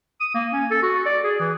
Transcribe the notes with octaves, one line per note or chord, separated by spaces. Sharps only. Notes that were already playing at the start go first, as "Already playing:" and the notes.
D#6
A#3
C#4
A4
F#4
D5
G#4
E3